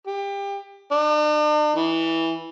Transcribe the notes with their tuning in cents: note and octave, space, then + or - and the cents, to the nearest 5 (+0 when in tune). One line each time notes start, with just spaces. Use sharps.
G4 +25
D4 +45
E3 -10